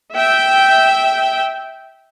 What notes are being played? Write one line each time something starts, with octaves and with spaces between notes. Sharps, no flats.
E5 G5